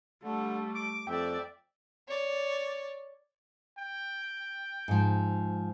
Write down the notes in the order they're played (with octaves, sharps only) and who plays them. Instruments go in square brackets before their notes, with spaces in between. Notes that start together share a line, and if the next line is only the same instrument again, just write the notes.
[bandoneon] D3 [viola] G3 A3
[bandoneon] D6 [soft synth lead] D7
[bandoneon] F2 [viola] D5 E5 [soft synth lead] G5
[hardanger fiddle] C#5 D5
[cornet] G5
[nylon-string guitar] G#2 F3